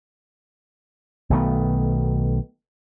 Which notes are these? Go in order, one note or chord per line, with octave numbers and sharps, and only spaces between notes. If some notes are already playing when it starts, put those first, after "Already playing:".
B1 D#3 A3 B3